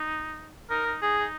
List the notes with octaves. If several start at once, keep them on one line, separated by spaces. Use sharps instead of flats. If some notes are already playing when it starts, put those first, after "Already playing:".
Already playing: D#4
D#4 A#4
D#4
D#4 G#4
D#4